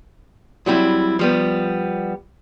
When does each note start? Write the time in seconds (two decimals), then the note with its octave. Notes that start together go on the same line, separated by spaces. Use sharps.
0.66 F#3 G3 C4 E4
1.19 F3 G3 B3